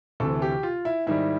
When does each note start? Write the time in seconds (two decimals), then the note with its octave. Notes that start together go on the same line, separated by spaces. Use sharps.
0.20 D2 C3 E3 A4
0.42 G4
0.63 F4
0.85 E4
1.07 G#2 D#3 G3 E4